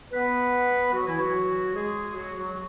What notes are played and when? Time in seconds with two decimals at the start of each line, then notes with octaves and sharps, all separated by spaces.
0.12 B3 B4
0.93 F#3 F#4
1.06 E3 E4
1.20 F#3 F#4
1.74 G#3 G#4
2.15 F#3 F#4
2.35 F#3 F#4